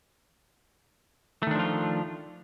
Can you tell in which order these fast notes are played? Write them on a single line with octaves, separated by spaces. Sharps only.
A3 D#3 D4 F3 F4